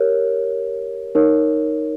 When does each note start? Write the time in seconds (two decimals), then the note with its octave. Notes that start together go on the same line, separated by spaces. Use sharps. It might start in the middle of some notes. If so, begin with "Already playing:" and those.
Already playing: G4 A#4 C#5
1.15 D#4 A#4 C#5